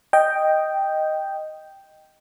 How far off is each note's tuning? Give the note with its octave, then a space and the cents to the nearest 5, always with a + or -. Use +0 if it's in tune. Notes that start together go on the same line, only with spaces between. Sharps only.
D#5 +0 G5 +0